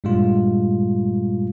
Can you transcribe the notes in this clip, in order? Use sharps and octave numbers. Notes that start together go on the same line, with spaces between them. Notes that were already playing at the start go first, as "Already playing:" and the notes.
G2 A#2 G3 G#3 F4